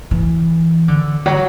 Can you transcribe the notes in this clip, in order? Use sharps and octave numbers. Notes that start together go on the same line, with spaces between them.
E3
D3
F#3